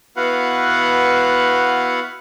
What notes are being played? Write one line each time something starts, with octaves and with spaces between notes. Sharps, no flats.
B3 E4 F#4 B4 F5 F#5